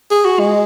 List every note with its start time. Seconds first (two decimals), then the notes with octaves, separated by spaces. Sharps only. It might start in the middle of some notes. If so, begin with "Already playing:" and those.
0.11 G#4
0.25 F#4
0.39 G#3